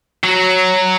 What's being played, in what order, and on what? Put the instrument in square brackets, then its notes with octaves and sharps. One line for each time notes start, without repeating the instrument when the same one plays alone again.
[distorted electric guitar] F#3